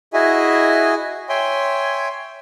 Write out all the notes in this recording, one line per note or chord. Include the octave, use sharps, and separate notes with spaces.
E4 F#4 G#4 D#5 E5 G#5
C#5 E5 G5 G#5 C6